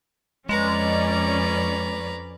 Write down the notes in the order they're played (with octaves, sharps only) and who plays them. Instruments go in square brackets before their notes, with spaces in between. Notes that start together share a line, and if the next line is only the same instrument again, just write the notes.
[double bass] F2 [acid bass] G#3 [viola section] C#4 D5 [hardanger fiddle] B4 A#5